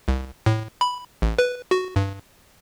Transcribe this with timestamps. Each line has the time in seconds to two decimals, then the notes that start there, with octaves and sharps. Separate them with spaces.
0.08 C2
0.46 A2
0.81 B5
1.22 A1
1.39 B4
1.71 F#4
1.96 G2